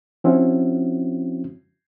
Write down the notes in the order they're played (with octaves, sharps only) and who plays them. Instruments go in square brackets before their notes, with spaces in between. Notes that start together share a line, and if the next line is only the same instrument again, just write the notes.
[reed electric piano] F3 C4 C#4 E4 F#4